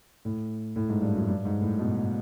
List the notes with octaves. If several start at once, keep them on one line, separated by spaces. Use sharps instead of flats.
A2
A2
G#2
G2
F#2
G2
G#2
A2
B2